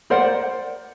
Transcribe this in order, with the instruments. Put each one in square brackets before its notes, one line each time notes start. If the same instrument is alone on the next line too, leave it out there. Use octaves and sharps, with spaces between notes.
[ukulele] A#4 D5 F#5 [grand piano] C5